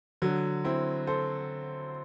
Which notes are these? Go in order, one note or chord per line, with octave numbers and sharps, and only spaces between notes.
D3 F#3
C4 E4
A4 C5